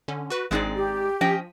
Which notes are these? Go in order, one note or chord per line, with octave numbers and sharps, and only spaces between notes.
D3 C#4
F#4 B4
G#1 G#3 C4 D#4 G#4 D5
G4
F3 C#4 D#5 G5